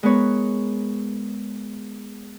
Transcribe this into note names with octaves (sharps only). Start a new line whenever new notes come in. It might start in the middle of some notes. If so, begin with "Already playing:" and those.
G#3 B3 A#4 B4 C#5